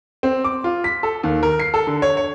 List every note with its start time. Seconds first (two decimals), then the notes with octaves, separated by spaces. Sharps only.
0.23 C4
0.44 D6
0.64 F4
0.84 B6
1.03 A4
1.23 D#2
1.43 A#4
1.60 C7
1.74 A4
1.87 D3
2.02 C#5
2.17 C#5